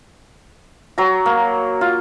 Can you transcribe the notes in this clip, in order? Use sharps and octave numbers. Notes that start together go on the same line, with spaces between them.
F#3 A#5
A#3
F4